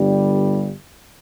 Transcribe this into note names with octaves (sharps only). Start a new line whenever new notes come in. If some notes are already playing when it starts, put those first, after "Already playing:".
Already playing: G1 G2 G3